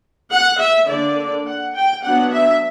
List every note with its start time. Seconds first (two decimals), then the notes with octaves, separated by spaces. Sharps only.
0.31 F#5
0.59 E5
0.87 D3 A#3 D4 D5
1.46 F#5
1.74 G5
2.04 F#3 B3 D4 F#5
2.32 E5